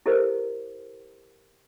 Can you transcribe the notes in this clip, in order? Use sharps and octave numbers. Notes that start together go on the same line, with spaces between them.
E4 G4 A4 A#4 C5 D#5